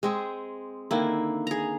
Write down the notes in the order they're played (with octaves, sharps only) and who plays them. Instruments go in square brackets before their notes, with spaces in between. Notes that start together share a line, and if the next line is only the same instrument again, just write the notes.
[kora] G#3 C4 G#4
[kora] D3 D#3 E4 [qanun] A#3
[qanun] G#4 A#5